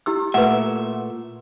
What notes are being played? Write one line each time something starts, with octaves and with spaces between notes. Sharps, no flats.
E4 G4 E6
A#2 A3 B4 E5 F#5